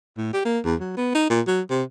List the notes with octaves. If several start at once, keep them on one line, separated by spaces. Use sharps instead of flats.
A2
G4
A#3
E2
F#3
B3
D#4
A#2
F#3
C3